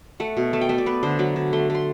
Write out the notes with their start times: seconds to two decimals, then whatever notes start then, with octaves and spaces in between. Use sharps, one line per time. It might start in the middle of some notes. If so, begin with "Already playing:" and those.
0.20 A3 F#5
0.37 B2
0.53 A3 A5
0.61 G5
0.69 A3 E5
0.78 D5
0.86 B3 B4
1.03 D3 C5
1.19 F#3 B5
1.36 D3
1.53 A3 C6
1.70 A3 C6